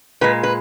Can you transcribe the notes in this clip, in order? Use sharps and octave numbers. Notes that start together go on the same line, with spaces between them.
A#2 G#3 B4
B4